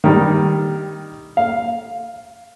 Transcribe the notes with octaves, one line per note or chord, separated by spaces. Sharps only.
D#3 G3
F5